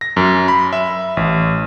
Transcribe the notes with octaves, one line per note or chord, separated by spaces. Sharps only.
A#6
F#2
B5
E5
A1